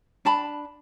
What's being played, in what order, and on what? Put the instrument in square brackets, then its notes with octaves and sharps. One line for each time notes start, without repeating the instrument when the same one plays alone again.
[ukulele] D4 A5 B5